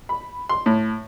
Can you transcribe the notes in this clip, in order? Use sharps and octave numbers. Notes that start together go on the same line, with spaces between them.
B5
C6
A2